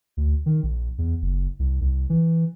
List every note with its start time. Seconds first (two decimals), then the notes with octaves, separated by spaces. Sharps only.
0.17 D2
0.46 D#3
0.63 A#1
0.98 E2
1.22 F#1
1.59 C2
1.81 C2
2.10 E3